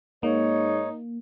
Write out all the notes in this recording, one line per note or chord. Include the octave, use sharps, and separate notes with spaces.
G#2 A#3 D#4 C#5